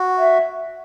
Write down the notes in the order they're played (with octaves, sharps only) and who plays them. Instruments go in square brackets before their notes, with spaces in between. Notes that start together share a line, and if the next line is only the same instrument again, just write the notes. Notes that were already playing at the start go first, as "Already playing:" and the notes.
Already playing: [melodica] F#4
[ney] E5